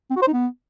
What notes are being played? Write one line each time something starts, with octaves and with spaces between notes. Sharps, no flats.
C4
F#4
C5
D#4
B3